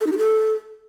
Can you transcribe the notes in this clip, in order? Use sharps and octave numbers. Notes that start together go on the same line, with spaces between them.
A4
D#4
G4
A4